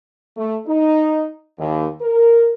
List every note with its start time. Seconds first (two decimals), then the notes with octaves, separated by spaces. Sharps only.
0.37 A3
0.67 D#4
1.59 D#2
2.01 A#4